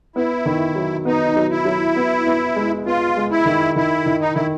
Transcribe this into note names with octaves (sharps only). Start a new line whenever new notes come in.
B3 E4
D#3
F#3
B3 D#4
F#3
E4
F#3
B3
B3
G#3
B3 F4
G#3
E4
D#3
D#3 E4
D#3
D#4
D#3 E4